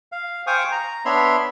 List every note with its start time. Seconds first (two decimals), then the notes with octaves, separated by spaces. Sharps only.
0.12 F5
0.47 C5 F5 G5 G#5 C#6 D#6
0.72 A#5
1.05 B3 D4 C#5 E5 B5 C6